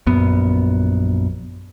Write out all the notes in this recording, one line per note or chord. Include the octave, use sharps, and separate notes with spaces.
A#1 F#2 B3